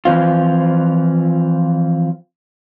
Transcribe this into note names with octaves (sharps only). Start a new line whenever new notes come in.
E3 F3 C4 F4